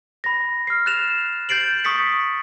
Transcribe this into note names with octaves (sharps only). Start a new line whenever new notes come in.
B5 A#6
F6 C7
F#6 A6 E7 F7
G6 A6 C7 D7 F#7
C#6 D#6 A6 B6 C#7